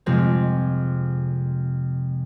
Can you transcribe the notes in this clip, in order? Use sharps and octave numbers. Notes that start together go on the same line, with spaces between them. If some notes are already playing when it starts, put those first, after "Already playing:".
F2 C3 G#3 C4